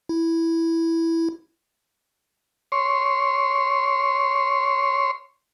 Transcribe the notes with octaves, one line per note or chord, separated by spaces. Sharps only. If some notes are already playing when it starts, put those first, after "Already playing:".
E4
C#5 C6